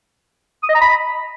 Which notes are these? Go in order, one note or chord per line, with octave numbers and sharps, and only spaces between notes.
D#6
D#5
A#5
B5